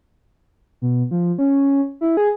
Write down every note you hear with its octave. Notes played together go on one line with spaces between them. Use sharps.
B2
F3
C#4
E4
G#4